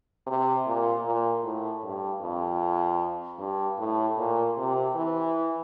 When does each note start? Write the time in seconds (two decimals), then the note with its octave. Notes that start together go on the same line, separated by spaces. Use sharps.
0.27 C3
0.66 A#2
1.04 A#2
1.43 A2
1.84 G2
2.22 F2
3.39 G2
3.79 A2
4.18 A#2
4.57 C3
4.95 E3